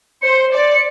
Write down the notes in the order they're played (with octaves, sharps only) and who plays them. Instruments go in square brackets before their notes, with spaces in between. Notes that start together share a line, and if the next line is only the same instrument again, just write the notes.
[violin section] C5 [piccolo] C#7
[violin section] D5
[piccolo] C#7